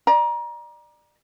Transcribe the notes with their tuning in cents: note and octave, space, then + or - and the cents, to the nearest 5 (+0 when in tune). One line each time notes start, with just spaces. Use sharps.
D5 +30 A#5 +30